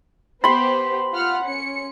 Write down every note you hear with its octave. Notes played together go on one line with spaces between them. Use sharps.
B3 G4 C5 B5 C6
F4 F#5 F6
C#4 C#7